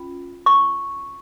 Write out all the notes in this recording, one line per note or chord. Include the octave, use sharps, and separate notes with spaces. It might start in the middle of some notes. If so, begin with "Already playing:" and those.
Already playing: C#4 F4
C#6